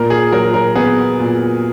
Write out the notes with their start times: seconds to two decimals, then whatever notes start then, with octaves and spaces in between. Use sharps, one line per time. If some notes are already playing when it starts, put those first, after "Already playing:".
Already playing: A#2 A#4
0.10 G#4
0.32 F#3 A#4
0.54 A#4
0.76 B3 G#4
1.19 A#2